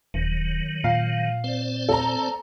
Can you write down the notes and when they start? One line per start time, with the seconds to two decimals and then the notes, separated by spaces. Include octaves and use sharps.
0.14 D#1 D#3 F#3
0.84 A#2 F5
1.44 C4 C5 D5
1.89 A4 A#5